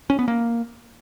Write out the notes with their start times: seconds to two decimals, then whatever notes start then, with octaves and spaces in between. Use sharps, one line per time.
0.10 C#4
0.19 B3
0.28 A#3